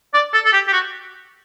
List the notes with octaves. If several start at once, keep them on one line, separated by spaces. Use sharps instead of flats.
D5
A4
A4
G4
G4
F#4